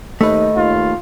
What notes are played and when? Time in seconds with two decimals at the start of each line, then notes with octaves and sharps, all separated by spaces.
0.21 D#2 A3 B4 D#5
0.56 D#2 F4